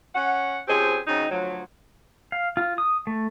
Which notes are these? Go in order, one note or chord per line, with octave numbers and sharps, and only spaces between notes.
C#4 F#5
F3 C4 C#4 G4 G#4
C#3 F#3 C4 D#4
D2 F3 F#3
F5
F4
D#6
A3